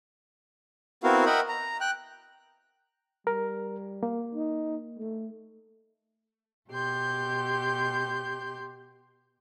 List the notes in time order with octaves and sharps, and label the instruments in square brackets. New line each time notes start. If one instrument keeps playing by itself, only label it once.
[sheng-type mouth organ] B3 C4 E4 F#4 A#4 F5
A#4 D#5 E5 F#5 G5 B5
A#5
G5 F#6
[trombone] G3 [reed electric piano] A#4
[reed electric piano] A#3
[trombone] D#4
A3
[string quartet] B2 G4 C6 G6